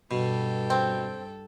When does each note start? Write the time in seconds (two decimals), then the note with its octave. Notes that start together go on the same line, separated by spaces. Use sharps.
0.11 G2 B2 A4 G5
0.70 C4